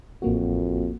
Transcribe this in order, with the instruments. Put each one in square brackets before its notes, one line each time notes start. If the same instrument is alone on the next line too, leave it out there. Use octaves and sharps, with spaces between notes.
[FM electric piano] A1 A#3 F#4 [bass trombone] F2